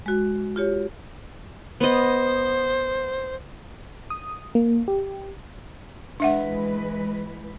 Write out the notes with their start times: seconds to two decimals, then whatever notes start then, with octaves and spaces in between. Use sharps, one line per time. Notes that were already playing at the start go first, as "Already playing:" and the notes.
0.06 G#3 F#4
0.56 F4 G4 C#5
1.80 B3 C5 D#5
4.10 D#6
4.55 A#3
4.88 G4
6.20 E3 G#3 D4 B4 E5 F#5